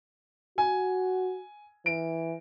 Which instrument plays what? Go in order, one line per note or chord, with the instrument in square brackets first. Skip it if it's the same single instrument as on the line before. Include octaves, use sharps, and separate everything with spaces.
[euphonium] F#4 [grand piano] G#5
[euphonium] E3 [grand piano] D7